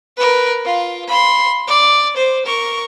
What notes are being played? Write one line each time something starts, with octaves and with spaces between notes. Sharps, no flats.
A#4 B4
F4
B5 C6
D5
C5
A#4 C#6